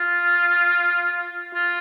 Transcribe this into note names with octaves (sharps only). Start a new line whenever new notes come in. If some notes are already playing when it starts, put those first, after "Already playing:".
Already playing: F4
F4